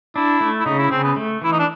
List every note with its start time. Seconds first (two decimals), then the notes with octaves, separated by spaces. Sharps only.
0.16 D4 E4
0.41 A3
0.60 E4
0.65 C#3 D#4
0.78 E4
0.91 C#3 C4
1.03 B3
1.16 A3
1.42 E3 E4
1.52 D#4
1.59 D4